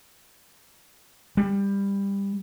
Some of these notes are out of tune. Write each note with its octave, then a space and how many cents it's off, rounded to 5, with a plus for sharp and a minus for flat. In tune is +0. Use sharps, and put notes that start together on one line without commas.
G3 +20